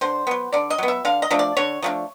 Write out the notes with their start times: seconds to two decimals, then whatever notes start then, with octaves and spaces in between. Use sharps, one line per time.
0.01 D3 C5
0.27 F#3 B3
0.52 D3 D5
0.70 D#5
0.78 F#3 B3
0.88 E5
1.05 D3 F5
1.22 D#5
1.30 F3 A3 D4
1.39 D5
1.57 D3 C#5
1.82 F3 A3 D4